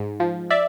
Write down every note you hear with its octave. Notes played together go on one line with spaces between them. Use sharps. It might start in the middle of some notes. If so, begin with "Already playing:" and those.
Already playing: G#2
F3
D5 E5